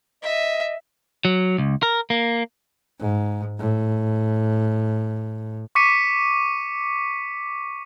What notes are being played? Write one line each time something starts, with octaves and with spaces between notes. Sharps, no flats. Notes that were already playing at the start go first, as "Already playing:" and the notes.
D#5 E5
F#3
C#2
A#4
A#3
G#2
A2
C#6 D6 B6 C#7 D#7